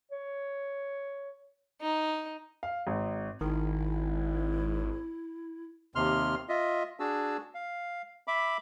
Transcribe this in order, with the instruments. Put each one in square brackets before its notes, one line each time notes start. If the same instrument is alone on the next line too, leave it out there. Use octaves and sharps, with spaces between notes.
[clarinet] C#5
[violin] D#4
[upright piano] F5
G#1
[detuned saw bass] G#1 [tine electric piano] D#3 [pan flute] E4
[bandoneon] D#2 C3 C6 F6
F4 D#5 E5
D4 F#4 G#4 A5 E6
F5
E5 B5 D6